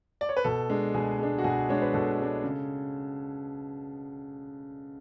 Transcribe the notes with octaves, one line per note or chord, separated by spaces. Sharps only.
D5
C#5
B4
B2 A4
G#3 D4
B2 G#4
G#3 D4
F#4
B2 G#4
G#3 D4 C#5
B4
B2 A4
G#3 D4
C#3